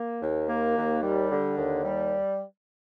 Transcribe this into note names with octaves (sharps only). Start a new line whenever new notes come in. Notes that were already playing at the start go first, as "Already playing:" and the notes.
Already playing: A#3
D#2
A#3
D#2
G3
D3
D#2
G3